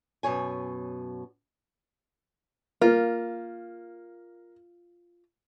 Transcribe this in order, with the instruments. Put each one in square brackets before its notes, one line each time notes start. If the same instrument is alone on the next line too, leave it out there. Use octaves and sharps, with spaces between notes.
[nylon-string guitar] F#2 B2 C#5 G#5
[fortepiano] A#3 [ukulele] F4